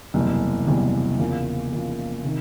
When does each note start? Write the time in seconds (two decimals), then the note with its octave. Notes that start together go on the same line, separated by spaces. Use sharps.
0.14 F#1 E2 C3 E3 G3
0.67 F#1 E2 C3 E3 G3
1.19 E2 C#3 F3 A#3
1.72 E2 C#3 F3 A#3
2.24 C3 D#3